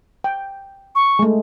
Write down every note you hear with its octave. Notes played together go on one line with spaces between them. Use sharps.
G5
C#6
G#3 A3